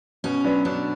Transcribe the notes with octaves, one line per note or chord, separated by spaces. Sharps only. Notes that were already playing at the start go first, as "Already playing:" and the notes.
B2 C#4
F#3 B3 D4
B2 D4